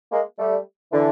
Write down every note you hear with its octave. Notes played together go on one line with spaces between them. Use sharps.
G#3 A#3
G3 A3
D3 E3